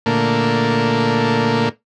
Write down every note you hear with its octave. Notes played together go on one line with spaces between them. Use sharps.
A#2 D3 A3 A#3